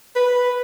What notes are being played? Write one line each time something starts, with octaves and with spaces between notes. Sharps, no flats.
B4